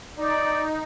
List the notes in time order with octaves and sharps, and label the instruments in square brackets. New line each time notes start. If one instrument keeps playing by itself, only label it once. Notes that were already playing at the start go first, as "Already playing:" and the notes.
[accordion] D#4 [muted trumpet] D5